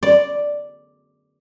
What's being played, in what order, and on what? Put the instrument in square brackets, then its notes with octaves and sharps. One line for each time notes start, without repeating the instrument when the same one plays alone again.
[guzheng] D5